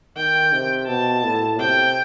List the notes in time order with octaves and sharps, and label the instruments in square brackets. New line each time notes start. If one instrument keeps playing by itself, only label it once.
[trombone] D#3 [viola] G5
[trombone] C3
[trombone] B2 [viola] A5
[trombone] A2
[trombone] C3 [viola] G5